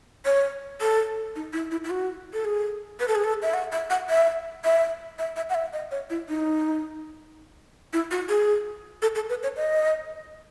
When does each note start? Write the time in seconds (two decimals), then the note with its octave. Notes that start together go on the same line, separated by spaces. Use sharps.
0.25 C#5
0.81 A4
1.36 D#4
1.53 E4
1.71 E4
1.84 E4
1.90 F#4
2.34 A4
2.45 G#4
3.00 B4
3.08 A4
3.15 G#4
3.24 A4
3.42 E5
3.54 F#5
3.72 E5
3.90 F#5
4.09 E5
4.64 E5
5.19 E5
5.36 E5
5.50 F#5
5.55 E5
5.73 D#5
5.91 C#5
6.10 E4
6.29 D#4
7.93 E4
8.11 F#4
8.29 G#4
9.02 A4
9.15 A4
9.29 B4
9.43 C#5
9.57 D#5